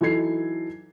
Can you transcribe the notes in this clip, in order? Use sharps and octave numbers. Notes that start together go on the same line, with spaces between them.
E3 F#3 D#4 A4 G#6 C7